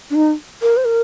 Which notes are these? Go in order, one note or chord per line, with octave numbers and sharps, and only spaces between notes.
D4
D#4
A#4
C5
A#4